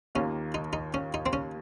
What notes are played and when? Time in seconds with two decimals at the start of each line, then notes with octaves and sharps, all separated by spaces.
0.15 D#2 D#3 A#3 C#4 F4
0.54 D#4
0.73 D#4
0.94 C#4
1.14 D#4
1.26 C4
1.33 C#4